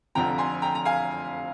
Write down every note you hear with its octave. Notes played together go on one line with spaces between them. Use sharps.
F1 F2 D3 F3 G5 A#5
G#5 C6
G5 A#5
A#5
F5 G#5